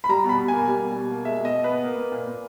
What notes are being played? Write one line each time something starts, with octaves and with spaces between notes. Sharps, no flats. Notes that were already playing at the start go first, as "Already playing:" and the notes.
B5
G3 A#5
B2
B5
B2
A#3 G#5
G3
B2
B2
A#3
G#3 E5
B2 D#5
B2
B3 B4
A#3
A#3
A#2
A#2